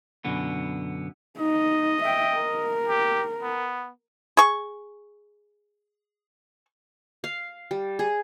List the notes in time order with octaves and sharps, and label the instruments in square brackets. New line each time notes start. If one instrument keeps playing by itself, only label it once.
[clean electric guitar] F#2 B2 D3 B3
[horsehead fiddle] D#4 [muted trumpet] D#5
[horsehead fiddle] E5 G5
A#4
[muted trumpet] G4
B3
[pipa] G#4 C#6
[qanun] F5
G3
G#4